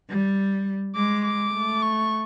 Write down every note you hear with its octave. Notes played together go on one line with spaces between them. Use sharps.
G3
G#3 D6
D6
A3
C#6